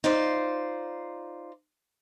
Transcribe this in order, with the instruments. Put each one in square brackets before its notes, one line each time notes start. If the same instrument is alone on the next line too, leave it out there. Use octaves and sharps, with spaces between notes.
[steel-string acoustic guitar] D#4 F4 C5 D5